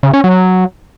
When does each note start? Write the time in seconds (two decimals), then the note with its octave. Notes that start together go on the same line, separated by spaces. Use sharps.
0.03 C#3
0.13 C#4
0.24 F#3